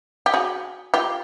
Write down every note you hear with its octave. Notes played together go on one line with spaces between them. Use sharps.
G4
F#4 G#4
F4 G4